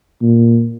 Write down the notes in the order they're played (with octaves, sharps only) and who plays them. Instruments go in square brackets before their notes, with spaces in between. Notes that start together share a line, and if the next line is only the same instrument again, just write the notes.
[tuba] A#2